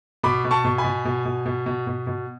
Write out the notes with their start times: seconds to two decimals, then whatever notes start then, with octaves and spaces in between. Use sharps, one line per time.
0.23 B2 B5 D6
0.45 B2
0.51 A5 C#6
0.65 B2
0.78 G#5 B5
0.84 B2
1.05 B2
1.25 B2
1.46 B2
1.66 B2
1.87 B2
2.07 B2